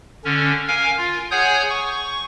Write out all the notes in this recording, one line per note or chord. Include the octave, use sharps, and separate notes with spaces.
D3 C#4
A#4 F5 G#5
F4
G#4 C#5 F#5 G#5 D#6 G6
C#6